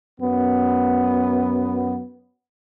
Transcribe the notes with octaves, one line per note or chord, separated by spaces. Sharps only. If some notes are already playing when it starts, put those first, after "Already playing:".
F#2 B3